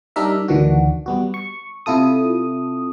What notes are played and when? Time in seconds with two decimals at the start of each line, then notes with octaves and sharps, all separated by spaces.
0.16 G3 D4 D#4 A#4 E5
0.48 D2 D#3 E3 D4 F#4
1.06 G3 B3 F#4
1.34 C#6
1.86 C3 E4 F4 A4 D#6